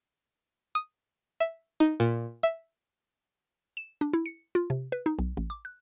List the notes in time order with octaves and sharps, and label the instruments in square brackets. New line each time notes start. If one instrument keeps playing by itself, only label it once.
[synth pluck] D#6
E5
D#4
A#2
E5
[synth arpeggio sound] E7
D4
E4
C#7
F4
C3
B4
D#4
B1
A1
D6
F#6